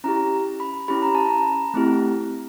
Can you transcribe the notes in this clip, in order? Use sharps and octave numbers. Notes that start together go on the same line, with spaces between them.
C#4 E4 G4 A#5
B5
C#4 E4 G4 B5
A#5
A5
A#5
A3 C4 E4 G4